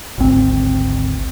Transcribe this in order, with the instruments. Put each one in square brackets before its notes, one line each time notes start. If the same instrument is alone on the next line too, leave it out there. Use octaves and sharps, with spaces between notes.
[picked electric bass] G#1 D2 C4